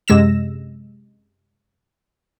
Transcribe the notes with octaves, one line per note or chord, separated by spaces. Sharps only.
F#2 C3 G#3 E6 A#6 E7